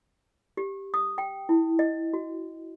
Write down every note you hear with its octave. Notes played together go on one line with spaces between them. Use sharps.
G4
D#6
G5
E4
D#5
F#4